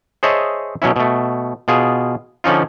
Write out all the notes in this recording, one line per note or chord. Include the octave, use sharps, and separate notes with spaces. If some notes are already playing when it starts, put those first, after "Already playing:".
G#4 C5 C#5 D#5 E5 A5
B2 F#3 C#4 E4
B2 A3
B2 F4 G#4
D3 F3 C#4 D#4 F4